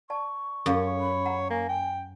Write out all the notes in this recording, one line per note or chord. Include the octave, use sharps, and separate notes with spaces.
D5 A5 C#6
F#2 G4 A4 C#5 F5
B5
F#5 A#5
A#3 G#5
G5